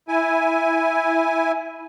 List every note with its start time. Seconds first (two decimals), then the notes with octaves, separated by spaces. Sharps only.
0.08 E4 G#5